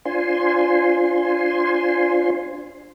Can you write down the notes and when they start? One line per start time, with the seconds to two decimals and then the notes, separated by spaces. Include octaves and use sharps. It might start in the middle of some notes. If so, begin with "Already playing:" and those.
0.05 D4 F4 C5 G#5 C6